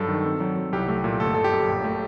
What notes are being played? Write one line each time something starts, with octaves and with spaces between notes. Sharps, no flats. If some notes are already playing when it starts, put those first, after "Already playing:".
Already playing: G2 F#3 G3 A4
D#3
C4
F#3
F#3
C2 G4
A3
A#2
G1 A4
G1 A4
G4
F#2
A#1
A3